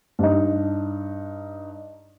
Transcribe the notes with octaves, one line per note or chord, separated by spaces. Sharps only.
G2 D4 D#4